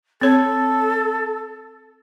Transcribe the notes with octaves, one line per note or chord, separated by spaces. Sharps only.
C4 A4 C#5